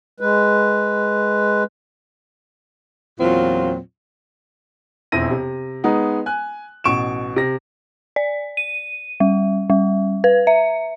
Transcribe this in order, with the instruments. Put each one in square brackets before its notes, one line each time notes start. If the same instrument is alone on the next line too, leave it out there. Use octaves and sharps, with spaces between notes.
[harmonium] G#3 B4
[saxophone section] E2 A#2 F#3 C4 F4
[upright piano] E1 F2 C4 E4 A#6 D#7
C3
G#3 B3 D#4
G#5 F#6
A1 B2 C#6 D7 E7
C3 A#6
[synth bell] D5
D#7
G3
G3
B4
E5